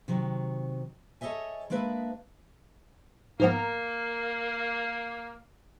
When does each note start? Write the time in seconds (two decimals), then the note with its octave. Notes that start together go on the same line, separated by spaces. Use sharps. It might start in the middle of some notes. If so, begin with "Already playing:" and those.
0.08 C3 D#3 F#3
1.21 A4 C#5 D#5 E5 G#5
1.70 G#3 A#3 D4 B4 E5
3.40 G#2 F3 A#3 B3 A#4